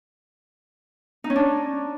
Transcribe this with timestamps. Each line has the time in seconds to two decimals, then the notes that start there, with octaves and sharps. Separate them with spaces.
1.24 D#4
1.30 C#4
1.36 D4